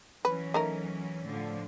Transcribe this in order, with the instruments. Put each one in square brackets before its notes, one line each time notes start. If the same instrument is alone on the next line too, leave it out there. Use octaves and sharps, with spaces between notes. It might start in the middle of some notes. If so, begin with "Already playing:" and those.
[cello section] E3 F#3 C#4 [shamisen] B4
[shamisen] A3 D#4 A#4
[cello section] A2 D3 F3